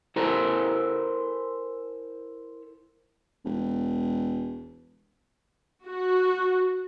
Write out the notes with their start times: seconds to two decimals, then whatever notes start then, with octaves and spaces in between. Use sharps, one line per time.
0.16 E4 A4 A#4 C5 G#5 A#5
3.45 E1
5.85 F#4